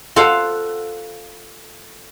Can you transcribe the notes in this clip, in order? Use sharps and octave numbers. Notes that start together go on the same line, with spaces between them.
F4 A4 C5 F5 F#5